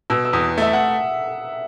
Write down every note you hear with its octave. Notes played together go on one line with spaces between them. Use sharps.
B2 E6
E6
E2 D#6
A3 E5
F#5